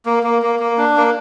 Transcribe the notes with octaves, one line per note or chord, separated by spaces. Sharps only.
A#3
A#3
A#3
A#3
D4
A#3